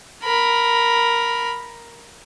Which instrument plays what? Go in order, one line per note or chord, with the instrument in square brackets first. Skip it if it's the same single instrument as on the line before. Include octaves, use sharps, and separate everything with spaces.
[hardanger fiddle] A#4 B5